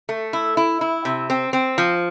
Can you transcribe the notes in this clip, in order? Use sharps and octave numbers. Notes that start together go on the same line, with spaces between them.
A3
E4
E4
E4
C3
C4
C4
F3